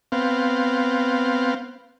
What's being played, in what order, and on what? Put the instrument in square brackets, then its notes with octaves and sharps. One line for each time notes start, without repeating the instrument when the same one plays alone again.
[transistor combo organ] B3 C4 F5